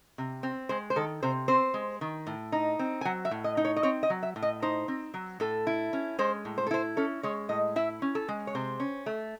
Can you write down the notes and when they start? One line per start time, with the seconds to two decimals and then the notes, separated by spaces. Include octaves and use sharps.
0.18 C3
0.43 C4
0.69 G#3 C5
0.90 C5
0.96 D#3 A4
1.23 C3 C5
1.48 C4 C5
1.74 G#3
2.01 D#3
2.27 A2
2.52 D#4
2.79 C4
3.01 G#5
3.05 F#3 F#5
3.25 E5
3.31 A2
3.44 D#5
3.57 D#4
3.65 C#5
3.76 D#5
3.83 C4 C#5
4.03 D#5
4.10 F#3
4.23 E5
4.36 A2
4.42 D#5
4.62 D#4 C5
4.88 C4
5.14 F#3
5.40 A2 A4
5.67 E4
5.93 C#4
6.19 G#3 C5
6.45 A2
6.58 C5
6.67 A4
6.71 E4 C5
6.97 C#4 A4
7.23 G#3 C#5
7.49 A2 D#5
7.76 E4 E5
8.02 C#4
8.15 A4
8.29 G#3
8.47 C#5
8.55 C3 C5
8.80 C#4
9.06 A3